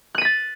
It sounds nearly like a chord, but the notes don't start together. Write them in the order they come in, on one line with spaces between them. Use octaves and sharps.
F#6 D#7 B6 A6